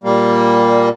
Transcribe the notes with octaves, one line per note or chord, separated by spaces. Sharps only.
A#2 G3 A#3